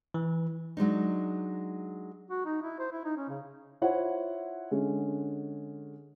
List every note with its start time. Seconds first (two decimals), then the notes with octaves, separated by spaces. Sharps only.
0.14 E3
0.77 F#3 G#3 D4 D#4
2.29 F#4
2.45 D#4
2.62 E4
2.79 C5
2.92 E4
3.05 D#4
3.17 C#4
3.29 C#3
3.82 E4 F4 C5 C#5 F#5
4.71 D3 G#3 C#4